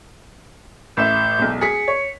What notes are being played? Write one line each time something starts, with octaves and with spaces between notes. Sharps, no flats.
A1 E5 G6 E7
E1 B1
G#4 B6 C#7
C#5